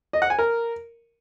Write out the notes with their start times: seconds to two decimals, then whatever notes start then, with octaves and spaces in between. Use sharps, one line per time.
0.13 D#5
0.22 F#5
0.30 G#5
0.39 A#4